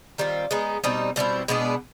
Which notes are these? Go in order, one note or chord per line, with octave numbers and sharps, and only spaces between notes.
D#3 G3 C4 F4
G#3 B3 D#4
B2 G3 C4 D#4
B2 G3 C4 E4
B2 G#3 B3 D4